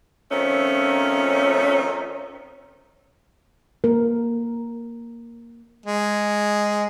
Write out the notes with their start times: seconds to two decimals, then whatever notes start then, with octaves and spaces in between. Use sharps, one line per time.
0.32 D#3 F3 A3 C4 C#4
3.84 A#3 A#4
5.86 G#3